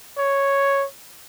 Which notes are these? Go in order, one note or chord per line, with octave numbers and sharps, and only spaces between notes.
C#5